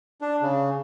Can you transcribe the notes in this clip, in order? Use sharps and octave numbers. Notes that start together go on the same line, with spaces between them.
D4
C#3